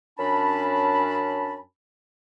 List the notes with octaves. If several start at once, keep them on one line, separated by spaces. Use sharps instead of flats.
F#2 C#4 D4 A5 B5